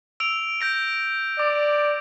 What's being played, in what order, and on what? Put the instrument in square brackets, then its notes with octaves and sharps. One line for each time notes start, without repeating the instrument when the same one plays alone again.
[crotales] E6 D7 F7
G6 A#6 D7
[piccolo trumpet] D5 [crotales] D6